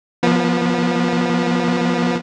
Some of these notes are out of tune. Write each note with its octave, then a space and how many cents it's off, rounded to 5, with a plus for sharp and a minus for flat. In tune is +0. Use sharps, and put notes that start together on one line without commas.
F3 +0 B3 -30